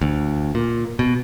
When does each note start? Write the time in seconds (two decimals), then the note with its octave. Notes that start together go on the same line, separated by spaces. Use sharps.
0.01 D2
0.55 A#2
0.99 B2